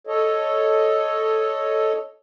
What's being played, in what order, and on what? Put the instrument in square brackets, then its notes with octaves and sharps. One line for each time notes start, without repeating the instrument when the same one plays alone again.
[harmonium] A4 C#5 D#5